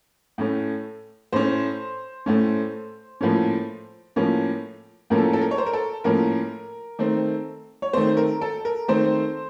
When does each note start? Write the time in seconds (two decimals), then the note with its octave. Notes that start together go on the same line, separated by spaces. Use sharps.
0.38 A2 A3 C#4
1.32 A2 A3 C#4 C5
2.26 A2 A3 C#4
3.21 A2 F3 A#3 C#4
4.16 A2 F3 A#3 C#4
5.10 A2 F3 A#3 C#4 A#4
5.18 A4
5.33 A4
5.41 A#4
5.51 C#5
5.58 C5
5.66 A#4
5.73 A4
6.04 A2 F3 A#3 C#4 A#4
6.99 D#3 A3 C4
7.82 C#5
7.93 D#3 A3 C4 C5
8.17 A#4
8.41 A4
8.65 A#4
8.88 D#3 A3 C4 C5